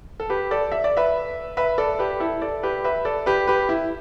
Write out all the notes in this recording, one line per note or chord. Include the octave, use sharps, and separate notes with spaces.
A4
G4 B4
A4 D5
E5
D5
B4 E5
B4 E5
A4 D5
G4 B4
E4 A4
A4 D5
G4 B4
B4 E5
A4 D5
G4 B4
G4 B4
E4